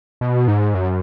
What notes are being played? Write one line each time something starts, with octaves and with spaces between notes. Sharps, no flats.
B2
G#2
F#2